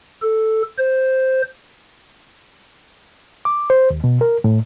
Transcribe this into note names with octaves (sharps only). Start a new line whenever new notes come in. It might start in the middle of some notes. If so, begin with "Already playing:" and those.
A4
C5
D6
C5
D#2
B2
A#4
A2